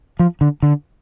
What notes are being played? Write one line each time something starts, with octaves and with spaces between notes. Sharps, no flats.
F3
D3
D3